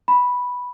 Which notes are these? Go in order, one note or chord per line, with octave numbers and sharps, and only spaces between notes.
B5